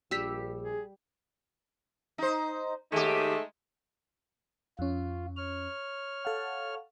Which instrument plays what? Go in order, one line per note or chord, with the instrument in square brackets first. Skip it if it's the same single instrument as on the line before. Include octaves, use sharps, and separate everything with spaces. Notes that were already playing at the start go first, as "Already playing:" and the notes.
[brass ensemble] A#1 [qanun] G3 G4 [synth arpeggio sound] E6 B6
[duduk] G#4
[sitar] D#4 C5
[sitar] D#2 G4 [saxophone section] G#3 A3 D#4
[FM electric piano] F2 C#4 [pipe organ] F4
[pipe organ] C#5 F6
[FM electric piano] A4 F5 F#5